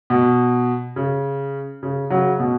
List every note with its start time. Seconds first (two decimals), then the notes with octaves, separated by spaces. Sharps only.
0.10 B2
0.96 C#3
1.83 C#3
2.10 C#3 F#3
2.39 B2